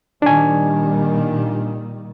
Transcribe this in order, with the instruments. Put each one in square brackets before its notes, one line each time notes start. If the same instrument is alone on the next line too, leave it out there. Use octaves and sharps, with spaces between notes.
[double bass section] A#2 D#3 G3 [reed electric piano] D4 G#5